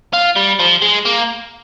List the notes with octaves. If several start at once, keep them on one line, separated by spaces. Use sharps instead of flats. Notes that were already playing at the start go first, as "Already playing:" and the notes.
F4
G3
F3
G#3
A#3